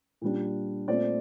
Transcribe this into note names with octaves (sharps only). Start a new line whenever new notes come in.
A#2 G3 D4
A#2 A3 C4 D5